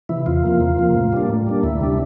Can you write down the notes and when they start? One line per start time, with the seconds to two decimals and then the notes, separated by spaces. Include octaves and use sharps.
0.09 C3 E3 E4
0.26 E2 F4
0.44 C3 F3 A#3
0.60 E2
0.78 C3 F3 A#3
0.95 A2
1.13 G3 A#3 D4
1.30 A2
1.47 G3 A#3 D4
1.63 D2 E4
1.81 C3 G3 D4